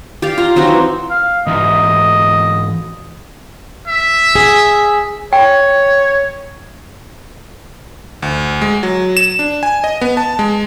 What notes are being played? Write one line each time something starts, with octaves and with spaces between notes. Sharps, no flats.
G4 D5 F5
F4 A#5
F#3 C4 D#4 F#4
E3
F5
G#2 E3 D#5 E5
E5
G#4
C#5 G5
D2
G#3
F#3
E7
D4
G#5
D#5
B3
A5
G#3